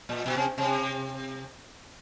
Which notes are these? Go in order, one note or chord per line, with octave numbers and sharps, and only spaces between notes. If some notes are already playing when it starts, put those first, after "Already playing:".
A#2
B2
C3
C3